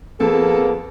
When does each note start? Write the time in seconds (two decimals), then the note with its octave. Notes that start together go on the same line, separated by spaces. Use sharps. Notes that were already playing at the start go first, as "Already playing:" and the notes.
0.20 F2 A#3 B3 G#4 A4